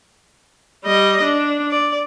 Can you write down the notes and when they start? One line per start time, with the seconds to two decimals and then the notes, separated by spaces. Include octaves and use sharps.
0.85 G3 D#5
1.23 D4
1.71 D5